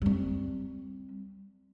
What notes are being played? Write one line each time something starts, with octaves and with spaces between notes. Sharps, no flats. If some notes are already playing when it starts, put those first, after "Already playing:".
G3 C4